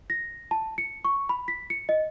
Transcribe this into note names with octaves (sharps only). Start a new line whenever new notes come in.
A#6
A5
C#7
C#6
B5
B6
C#7
D#5